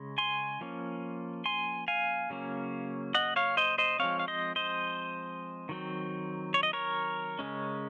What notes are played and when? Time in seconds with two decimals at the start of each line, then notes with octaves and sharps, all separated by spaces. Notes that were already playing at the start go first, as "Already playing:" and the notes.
Already playing: C#3 G#3 C#4
0.18 G#5 C6
0.61 F3 A#3 C#4
1.45 G#5 C6
1.88 F5 G#5
2.30 C#3 F#3 A#3 C#4
3.14 D#5 F#5
3.36 C#5 F5
3.57 C5 D#5
3.78 C5 D#5
3.99 F3 G#3 C4 C#5 F5
4.19 F5
4.28 C5 D#5
4.56 C5 D#5
5.69 D#3 F#3 C4
6.54 C#5
6.63 D#5
6.73 A#4 C#5
7.39 C#3 G#3 C#4